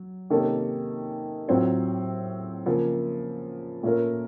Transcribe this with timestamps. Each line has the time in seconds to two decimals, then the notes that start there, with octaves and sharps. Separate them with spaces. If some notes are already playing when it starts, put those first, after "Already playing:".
Already playing: F#3
0.30 C3 D#3 A#3 C#4 A4
1.48 A2 F#3 C4 F4
2.66 C#3 F3 A#3
3.83 A#2 A3 C#4 F4 A#4